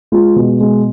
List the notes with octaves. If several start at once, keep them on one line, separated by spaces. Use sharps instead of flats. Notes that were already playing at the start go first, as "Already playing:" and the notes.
G#3 F4
B2
G#3